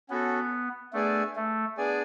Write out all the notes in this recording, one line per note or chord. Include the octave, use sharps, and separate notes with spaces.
B3 C#4 F#4 A4
A3 B3 D4 G#4 D5 G#5
A3
B3 D4 G#4 D5 G#5